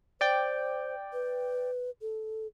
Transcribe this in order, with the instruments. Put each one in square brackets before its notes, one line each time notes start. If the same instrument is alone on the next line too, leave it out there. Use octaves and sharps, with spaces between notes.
[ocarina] C5 [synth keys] D5 G5
[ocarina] B4
A4